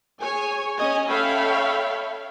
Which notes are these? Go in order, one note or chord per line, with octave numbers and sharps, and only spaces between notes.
G#4 C#5 G#5
C#4 C#5 D#5 G#5
A4 C#5 E5 F5 G5 B5